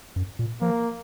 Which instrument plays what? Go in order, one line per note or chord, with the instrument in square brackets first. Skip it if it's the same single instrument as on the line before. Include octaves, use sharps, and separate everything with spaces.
[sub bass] F#2
A#2
[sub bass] F3 [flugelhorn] A#3